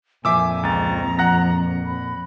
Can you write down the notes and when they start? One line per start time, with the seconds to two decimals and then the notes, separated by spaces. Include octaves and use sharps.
0.25 F2 A#2 F3 E5 G#5 D6 E6
0.63 C#2 A#5 A6
1.19 F#5 F#6 A#6
1.85 B5